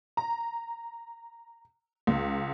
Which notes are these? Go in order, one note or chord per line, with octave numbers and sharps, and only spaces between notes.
A#5
C#2